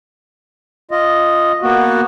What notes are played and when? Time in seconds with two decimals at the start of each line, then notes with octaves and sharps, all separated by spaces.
0.91 F4 D#5
1.62 A#3 B3 F#4